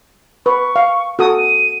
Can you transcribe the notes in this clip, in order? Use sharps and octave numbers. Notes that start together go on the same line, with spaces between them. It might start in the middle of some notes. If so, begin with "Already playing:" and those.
B4 C#6
F5
F#4 A4 D#6
D#7